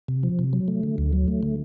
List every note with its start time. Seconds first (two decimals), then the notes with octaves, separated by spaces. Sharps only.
0.08 C3
0.23 F3
0.39 C3
0.53 F#3
0.68 A3
0.83 D3
0.98 D2
1.13 F#3
1.28 A3
1.43 D3